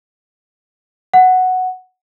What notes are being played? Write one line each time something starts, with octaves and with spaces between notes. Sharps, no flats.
F#5